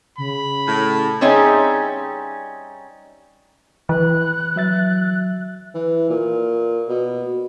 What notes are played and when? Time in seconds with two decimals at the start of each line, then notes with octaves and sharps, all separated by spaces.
0.18 C#3 B5
0.67 A2
1.21 G3 C4 C#4 D#4 G#4 E5
3.89 E3 B4 F#6
4.56 F#3 E5 A6
5.75 E3
6.10 A#2
6.89 B2